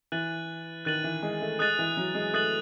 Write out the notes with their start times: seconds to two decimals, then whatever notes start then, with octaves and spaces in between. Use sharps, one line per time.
0.12 E3 F#6 A6 D#7 F#7
0.85 D#3 F#6 A6 D#7 F#7
1.04 E3
1.23 G#3
1.41 A3
1.59 G#3 D#6 F#6 A6 D#7 F#7
1.79 E3
1.97 F#3
2.14 G#3
2.33 A3 D#6 F#6 A6 D#7 F#7